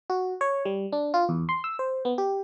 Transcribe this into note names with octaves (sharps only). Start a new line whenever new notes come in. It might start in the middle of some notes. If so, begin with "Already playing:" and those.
F#4
C#5
G3
D4
F4
E2
C6
E6
C5
B3
G4